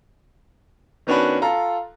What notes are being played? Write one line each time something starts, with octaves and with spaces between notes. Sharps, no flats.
D#3 B3 C#4 D4 F#4 B4
F4 A4 A#5